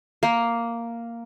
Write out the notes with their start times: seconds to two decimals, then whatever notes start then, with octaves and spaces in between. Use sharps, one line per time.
0.23 A#3